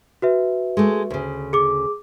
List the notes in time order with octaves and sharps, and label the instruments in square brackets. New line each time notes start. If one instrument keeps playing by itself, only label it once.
[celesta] F#4 B4 E5
[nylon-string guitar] G#3 A3
D2 C#3
[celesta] G#4 D6